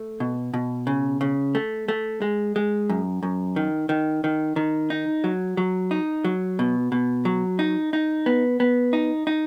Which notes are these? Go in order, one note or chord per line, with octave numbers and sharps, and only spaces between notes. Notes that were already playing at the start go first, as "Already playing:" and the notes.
Already playing: A3
B2
B2
C#3
C#3
A3
A3
G#3
G#3
F#2
F#2
D#3
D#3
D#3
D#3
D#4
F#3
F#3
D#4
F#3
B2
B2
F#3
D#4
D#4
B3
B3
D#4
D#4